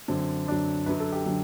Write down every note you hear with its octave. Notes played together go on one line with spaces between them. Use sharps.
F#2 D3 F#3 C4
F#2 D3 F#3 D4
F#2 D3 F#3 B4
A4
G4
D3 F#3